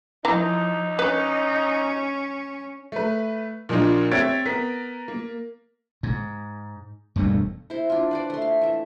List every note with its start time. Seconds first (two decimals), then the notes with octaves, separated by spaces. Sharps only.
0.25 E3 F3 D#4 A#5
0.99 C#4 B4
2.92 A3 B4
3.69 A#2 F3 A#3 D4 D#4 F4
4.12 C4 C#5 E5 G#6 A6 D7
4.45 B3 A#4 B6
5.08 A#3
6.03 G#2
7.16 E1 D2 G2 A3
7.70 E4 C5
7.90 D4 F4
8.11 B4 C5 D5
8.30 A3 C6
8.42 F5
8.62 E3 E5